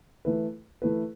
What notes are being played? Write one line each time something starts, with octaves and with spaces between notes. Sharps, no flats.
E3 A3 E4 B4
E3 A3 E4 B4